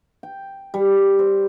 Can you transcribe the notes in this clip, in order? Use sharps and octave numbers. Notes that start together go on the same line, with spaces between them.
G5
G3
C5